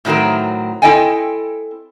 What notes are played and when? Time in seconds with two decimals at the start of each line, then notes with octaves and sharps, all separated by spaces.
0.05 A2 D#3 F#3 C4 A#4
0.82 C4 E4 A4 D#5 G5 G#5